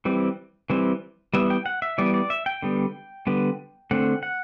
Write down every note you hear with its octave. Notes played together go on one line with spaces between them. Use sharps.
E3 G3 C4
E3 G3 C4
E3 G3 B3 E5
G5
F#5
E5
E3 G3 B3 D5
D5
E5
G5
D3 G3 B3
D3 G3 B3
D3 A3 C4 F#5
F#5